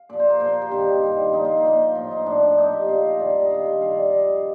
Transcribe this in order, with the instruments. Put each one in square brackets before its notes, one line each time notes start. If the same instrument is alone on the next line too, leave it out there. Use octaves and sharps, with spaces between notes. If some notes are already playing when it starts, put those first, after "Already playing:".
Already playing: [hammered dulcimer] F5
A#2 F3 D5
C5
A#4
A#2 F3 C5
G4
G2 D#3 F4
G2 D#3
A#2 F3 D#4
F4
D#4
A#2 F3
A2 F3 F4
D#4
A2 F3 D4
D4
A#2 F3 D#4
G4
A#2 F3 F5
F5
D#5
G2 D#3 D5
D5
D#5
G2 D#3 F5
G5
G2 F3 F5
D5
D5
G2 F3 D#5